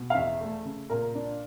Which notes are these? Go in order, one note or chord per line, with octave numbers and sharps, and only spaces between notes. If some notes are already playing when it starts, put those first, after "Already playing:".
Already playing: B2
F5
E2 E5
A3
C#3
A#2 A#4
D4